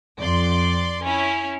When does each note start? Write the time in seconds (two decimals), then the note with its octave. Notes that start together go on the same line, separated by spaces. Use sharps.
0.18 F2 D5 C6
1.02 C#4 E4